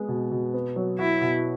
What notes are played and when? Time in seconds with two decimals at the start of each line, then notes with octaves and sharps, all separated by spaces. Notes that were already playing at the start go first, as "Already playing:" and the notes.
Already playing: G#3 B3
0.08 B2
0.31 B2
0.54 B3
0.76 F#3
0.99 E4 F#4
1.21 B2